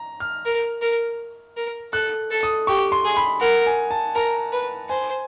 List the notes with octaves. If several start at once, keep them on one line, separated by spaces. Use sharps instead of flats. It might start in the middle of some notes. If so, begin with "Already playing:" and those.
Already playing: A#5
F6
A#4
A#4
A#4
A4 F#6
A4
D#6
G4 C#6
C6
G#4
B5
A#4 F#5
G#5
A5
A#4 A#5
B4
C5 G#5